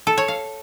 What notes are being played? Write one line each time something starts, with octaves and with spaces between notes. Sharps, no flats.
A4
C#5
F5